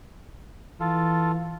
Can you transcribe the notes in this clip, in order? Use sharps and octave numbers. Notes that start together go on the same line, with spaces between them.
E3 F4 A4